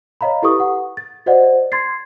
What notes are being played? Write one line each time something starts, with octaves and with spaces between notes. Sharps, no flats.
C#5 D#5 F5 A#5 B5
E4 G4 A4 B4 C#6 D#6
F#5
A6
F#4 C5 D5 D#5 F#5
C6 G#6 A6 C7